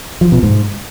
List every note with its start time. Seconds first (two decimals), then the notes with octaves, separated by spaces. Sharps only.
0.21 F3
0.32 B2
0.43 G#2